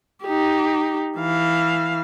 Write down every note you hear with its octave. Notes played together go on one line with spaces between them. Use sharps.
D#4 G4
E3 F5